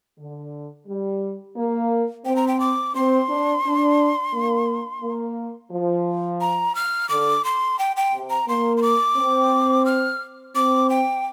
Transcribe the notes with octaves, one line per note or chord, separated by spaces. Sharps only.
D3
G3
A#3
C4 G5
A#5
G5
D6
C4 C6
D4
D4
A#3
A#3
F3
A#5
F6
D3 D6
C6
G5
G5
C3
A#5
A#3 C6
C6
D6
C4
F6
C4 D6
G5